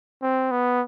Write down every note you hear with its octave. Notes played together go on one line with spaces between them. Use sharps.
C4
B3